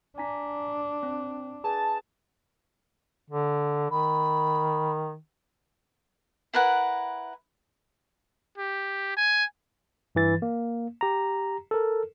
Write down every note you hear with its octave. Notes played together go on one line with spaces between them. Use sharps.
D4 G#5 A#5 B6
C4
G#4 B4 G#5 A5
D3
D#3 B5
E4 A#4 B4 F#5
G4
G#5
G2 E3 A6
A#3
G4 A#5
A4 A#4